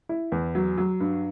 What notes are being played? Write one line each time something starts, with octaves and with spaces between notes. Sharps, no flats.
E4
E2
F#3
F#3
G2